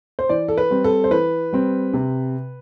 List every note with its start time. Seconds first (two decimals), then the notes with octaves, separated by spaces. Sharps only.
0.19 C5
0.29 E3 D5
0.48 A4
0.58 B4
0.70 G3 C4
0.84 A4
1.04 C5
1.11 E3 B4
1.53 G3 C4
1.94 C3